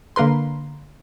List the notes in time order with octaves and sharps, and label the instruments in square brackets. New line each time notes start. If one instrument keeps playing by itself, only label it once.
[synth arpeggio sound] D3 A#3 A#4 B4 C6